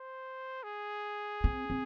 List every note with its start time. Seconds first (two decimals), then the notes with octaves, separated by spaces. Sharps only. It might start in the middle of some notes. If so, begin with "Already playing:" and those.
Already playing: C5
0.63 G#4
1.44 C4
1.70 C4